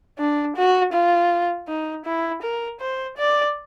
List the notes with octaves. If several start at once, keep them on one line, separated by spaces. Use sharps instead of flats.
D4
F#4
F4
D#4
E4
A#4
C5
D5